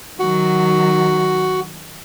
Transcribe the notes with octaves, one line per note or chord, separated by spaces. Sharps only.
D#3 F#3 F#4